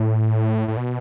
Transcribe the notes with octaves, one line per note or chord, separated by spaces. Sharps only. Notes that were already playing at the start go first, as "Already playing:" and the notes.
Already playing: A2
A2
B2